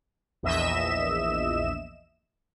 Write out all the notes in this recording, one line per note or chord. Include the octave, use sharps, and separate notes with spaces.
A#1 E2 D#5 E5 E7